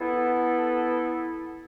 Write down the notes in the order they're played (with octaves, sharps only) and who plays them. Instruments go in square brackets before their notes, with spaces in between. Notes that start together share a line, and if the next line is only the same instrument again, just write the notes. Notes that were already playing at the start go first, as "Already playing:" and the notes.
[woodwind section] B3 E4 A4